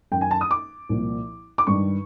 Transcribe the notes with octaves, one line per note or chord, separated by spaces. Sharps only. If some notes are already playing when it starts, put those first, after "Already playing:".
F#2 D#3 G5
G#5
A5
D#6
D6
C2 A#2 F3
D6
G2 D#3 C#6